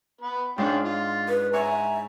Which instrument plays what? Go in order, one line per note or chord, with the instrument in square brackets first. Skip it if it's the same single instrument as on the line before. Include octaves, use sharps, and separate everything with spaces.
[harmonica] B3 B4
[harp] G#2 D4 F#6 [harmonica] C#4 F4 G5
[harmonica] F4
[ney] B4
[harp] C#5 C#6 [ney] E5 [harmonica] G#5 A#5